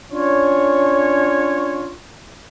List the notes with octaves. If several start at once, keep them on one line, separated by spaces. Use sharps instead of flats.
C#4 D4 F4 C#5